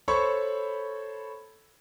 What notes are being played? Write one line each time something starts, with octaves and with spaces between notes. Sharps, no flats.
A4 C5 C#5 B5 C#6